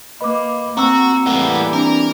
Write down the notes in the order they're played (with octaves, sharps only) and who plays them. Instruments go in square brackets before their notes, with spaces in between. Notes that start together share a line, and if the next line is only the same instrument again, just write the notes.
[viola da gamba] A#3 [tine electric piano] B4 B5 [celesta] D#5 D6
[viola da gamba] A#3 [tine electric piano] C4 [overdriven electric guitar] F#4 [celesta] A#5 E6
[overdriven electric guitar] A2 B3 [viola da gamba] E3 G3 A#3
[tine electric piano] C4 D4 [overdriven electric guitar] A#4